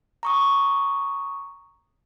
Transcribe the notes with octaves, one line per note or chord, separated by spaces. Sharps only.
A#5 C#6 D#6